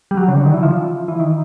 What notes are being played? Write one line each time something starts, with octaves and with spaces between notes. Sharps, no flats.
G3
F#3
C#3
D3
D#3
E3
F3
E3
D#3